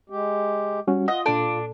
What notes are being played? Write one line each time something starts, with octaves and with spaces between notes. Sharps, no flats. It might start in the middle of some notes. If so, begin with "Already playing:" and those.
G#3 G4
G3 C#4 F#4
F4 D#5 F#5
A#2 D4 A4